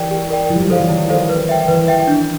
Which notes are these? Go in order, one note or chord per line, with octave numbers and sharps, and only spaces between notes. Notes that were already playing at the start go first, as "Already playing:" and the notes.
Already playing: E3 G4 A#4 D5 G5
G4
A#4 D5 G5
F3 E4
G3
F#3
F3 A4 C5 F5
E3
D#3 E4
A4 C5 F5
B4
E5 G5
E3 B4
E5 G5
D4